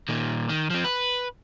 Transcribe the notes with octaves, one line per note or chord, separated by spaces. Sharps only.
A#2 D#3
D#3
F3 C4
B4